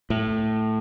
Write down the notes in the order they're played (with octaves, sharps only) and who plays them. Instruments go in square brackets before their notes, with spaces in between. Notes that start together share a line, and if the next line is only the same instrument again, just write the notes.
[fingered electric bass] A2